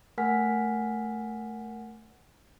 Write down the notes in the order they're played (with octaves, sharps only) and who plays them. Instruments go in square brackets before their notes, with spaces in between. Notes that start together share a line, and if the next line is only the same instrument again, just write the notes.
[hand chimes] A3 A#4 F#5 G#5 F6 B6